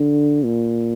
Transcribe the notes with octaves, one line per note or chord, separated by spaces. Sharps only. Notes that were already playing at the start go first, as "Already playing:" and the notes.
Already playing: D3
A#2